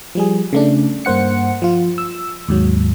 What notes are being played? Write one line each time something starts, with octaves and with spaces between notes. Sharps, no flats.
F3 G3 G#4
C#3 A3 D4
G2 A#3 C5 F#5 C#7
F3 F4
E6
D#2 G#2 F#3